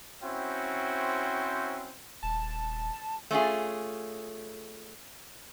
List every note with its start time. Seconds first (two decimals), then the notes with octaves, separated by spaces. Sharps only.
0.23 C4 C#4 E4 F#4 C5 G5
2.23 D#1 A5
3.31 A3 C#4 F4 G#4